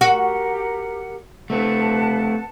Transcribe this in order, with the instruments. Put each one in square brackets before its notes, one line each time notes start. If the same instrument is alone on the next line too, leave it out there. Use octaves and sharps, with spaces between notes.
[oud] F#4 [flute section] G4 A#4 F#5
[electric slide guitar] A3 C4 [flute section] B4 F#5 A5